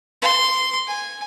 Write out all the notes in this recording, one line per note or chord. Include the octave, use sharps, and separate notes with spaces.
C6
G#5